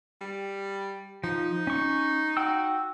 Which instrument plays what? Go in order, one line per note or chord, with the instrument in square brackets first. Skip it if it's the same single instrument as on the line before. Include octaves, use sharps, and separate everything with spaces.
[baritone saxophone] G3
[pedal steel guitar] F3 [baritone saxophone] D#4
[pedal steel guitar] C#4 C#6
F#4 G5 E6